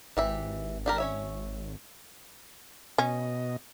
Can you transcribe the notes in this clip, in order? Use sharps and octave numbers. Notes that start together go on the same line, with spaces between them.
G#1 E3 G4 E5
D4 G4 A#4
C#4 C#5 E5
B2 C#4 D#5